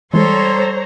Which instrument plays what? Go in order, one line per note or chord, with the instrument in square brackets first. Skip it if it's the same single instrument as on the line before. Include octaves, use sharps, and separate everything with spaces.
[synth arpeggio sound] E3 G#3 [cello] G3 A4 [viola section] C5 C#5 A#5 [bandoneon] C6